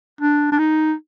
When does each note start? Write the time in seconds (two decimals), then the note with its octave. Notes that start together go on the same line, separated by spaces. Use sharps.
0.21 D4
0.52 D4
0.59 D#4